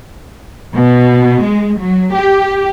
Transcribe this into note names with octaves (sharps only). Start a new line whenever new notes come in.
B2
G#3
F#3
G4